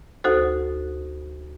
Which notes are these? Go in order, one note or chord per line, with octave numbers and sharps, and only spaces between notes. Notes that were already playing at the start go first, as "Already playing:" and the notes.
D2 D#4 F#4 A4 C5